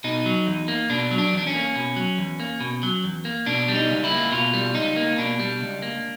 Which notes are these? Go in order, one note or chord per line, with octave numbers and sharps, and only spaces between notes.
B2 D#4
F#3
E2
A#3
B2 D4
F#3
D4
E2 D4
C#4
A#3
B2
F#3
E2
A#3
B2
F#3
E2
A#3
B2 D4
G3
D#4
C#2
E4
A#3
B2 F4
G3
C#2 D#4
A#3
B2 D4
G3
C#2
A#3